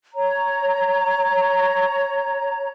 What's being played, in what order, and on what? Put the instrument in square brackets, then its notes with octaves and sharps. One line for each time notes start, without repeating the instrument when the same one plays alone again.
[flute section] C#5 A#5